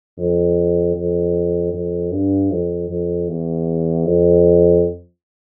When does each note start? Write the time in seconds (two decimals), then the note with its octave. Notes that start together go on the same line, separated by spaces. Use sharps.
0.18 F2
0.96 F2
1.73 F2
2.12 G2
2.51 F2
2.89 F2
3.29 E2
4.05 F2